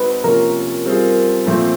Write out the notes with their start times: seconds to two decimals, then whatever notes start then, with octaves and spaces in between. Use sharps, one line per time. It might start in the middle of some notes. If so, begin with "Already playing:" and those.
Already playing: G#3 C4 D#4 F#4 B4
0.24 C3 F3 A#3 C#4 F4 A#4
0.85 G3 C4 F4 G#4
1.46 A#2 F3 A3 C4